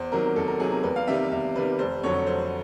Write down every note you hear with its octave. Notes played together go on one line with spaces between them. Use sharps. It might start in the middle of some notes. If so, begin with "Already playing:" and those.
Already playing: E2 C5
C3 D#3 F#3 A#4
E2 A4
A#4
C3 D#3 F#3 G#4
A#4
E2 B4
F5
C3 D#3 G3 E5
E2 E5
C3 D#3 G3 B4
F1 C5
F2 D3 F#3 C#5
C#5
F1 C5